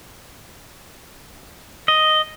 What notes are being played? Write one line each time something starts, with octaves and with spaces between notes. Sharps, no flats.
D#5